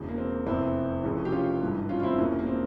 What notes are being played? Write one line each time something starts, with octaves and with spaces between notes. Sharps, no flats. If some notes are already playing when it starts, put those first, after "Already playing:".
Already playing: E1 E2 C#3
A#3
C4
F1 E2 E3 C4 E4
F1 F2 C#3 E3
G4
C#4 F4
G#1 G2 E3
C#4 F4
F4
C4 E4
E1 E2 E3 A#3 C#4
A#3
C4